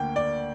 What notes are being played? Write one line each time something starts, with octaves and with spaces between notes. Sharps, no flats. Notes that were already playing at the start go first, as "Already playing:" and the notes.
Already playing: D2 D3 A#3 G5
D5